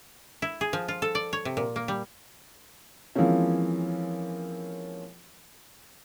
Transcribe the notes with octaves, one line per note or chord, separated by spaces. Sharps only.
E4
G#4
F3
F4
A4
D5
C#5
C3
A#2
A#3
G3
E3 F3 G#3 A#3 C4 C#4